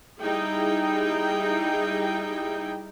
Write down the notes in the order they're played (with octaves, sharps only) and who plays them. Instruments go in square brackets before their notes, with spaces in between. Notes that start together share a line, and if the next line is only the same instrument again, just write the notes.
[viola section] G3 D#4 E4 G#4 G5